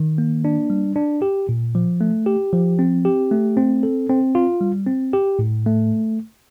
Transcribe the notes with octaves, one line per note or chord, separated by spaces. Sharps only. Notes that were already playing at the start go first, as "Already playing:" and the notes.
Already playing: D#3
A#3
D4
G3
D4
G4
A#2
F3
A3
G4
F3
C4
G4
A3
C4
A4
C4
F4
G3
C4
G4
A2
A3